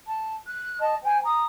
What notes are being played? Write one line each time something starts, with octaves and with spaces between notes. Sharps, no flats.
A5
F#6
D#5 A5
C5 G5 G#5
A#5 D#6